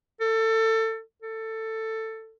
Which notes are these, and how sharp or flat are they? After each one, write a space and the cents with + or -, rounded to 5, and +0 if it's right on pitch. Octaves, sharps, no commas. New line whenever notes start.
A4 +25
A4 +15